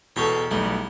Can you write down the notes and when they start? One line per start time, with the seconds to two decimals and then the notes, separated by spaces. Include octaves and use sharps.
0.16 E2 B2 A4 C#5 G5
0.51 B1 E2 G3 A3